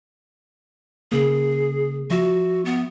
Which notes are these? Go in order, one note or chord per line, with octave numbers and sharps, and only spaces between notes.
C#3 A#3 G#4
F3 F#4 E5
B3